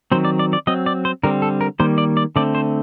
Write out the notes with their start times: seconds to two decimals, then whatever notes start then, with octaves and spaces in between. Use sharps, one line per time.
0.12 D#3 F#3 C4 C5
0.25 D5
0.39 D5
0.53 D5
0.67 F#3 C4 D#5
0.86 D5
1.05 C5
1.23 D3 G3 C4 A#4
1.42 A4
1.61 A#4
1.80 D#3 G3 A#3 C5
1.98 D5
2.17 D5
2.36 D3 A3 C4 D5
2.55 C5